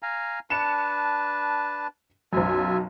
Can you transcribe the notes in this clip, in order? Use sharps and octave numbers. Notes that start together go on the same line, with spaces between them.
F5 G#5 A#5
D4 B4 A5 C#7 E7
B1 F#2 F4 E5 G#5